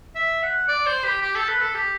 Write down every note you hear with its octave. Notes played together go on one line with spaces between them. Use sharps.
E5
F#5
D5
C5
G4
G4
A4
B4
A4
G4